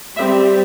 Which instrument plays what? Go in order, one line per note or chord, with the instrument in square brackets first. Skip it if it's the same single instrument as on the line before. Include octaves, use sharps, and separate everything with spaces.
[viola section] G3 C4 E5